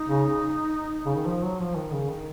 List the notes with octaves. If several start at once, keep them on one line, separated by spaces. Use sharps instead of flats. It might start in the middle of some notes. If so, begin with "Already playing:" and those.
Already playing: D#4
C#3
C#3
D#3
F3
F#3
F3
D#3
C#3
D#3